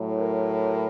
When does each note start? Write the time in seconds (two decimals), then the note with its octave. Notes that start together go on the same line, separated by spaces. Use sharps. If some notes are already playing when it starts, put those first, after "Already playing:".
Already playing: A2 F#3
0.19 A#4